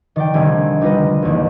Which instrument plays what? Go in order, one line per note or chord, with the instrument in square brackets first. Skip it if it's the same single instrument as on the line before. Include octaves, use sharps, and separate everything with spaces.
[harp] D#3 D5 G5
C2 D3 D#3 A3 G#5
G3 D#4 F4 B4 D#5
G#3
A1 D#2